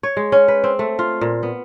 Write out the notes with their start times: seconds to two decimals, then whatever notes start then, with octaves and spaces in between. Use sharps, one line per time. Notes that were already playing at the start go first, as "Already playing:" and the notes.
0.03 C#5
0.17 G#3
0.32 C#4
0.48 B4
0.64 C4
0.79 A3
0.99 F4
1.21 A#2
1.43 B3